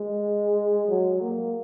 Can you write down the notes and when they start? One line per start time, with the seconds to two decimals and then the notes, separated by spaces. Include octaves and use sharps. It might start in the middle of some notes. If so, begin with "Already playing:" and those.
Already playing: G#3
0.88 F#3
1.21 A#3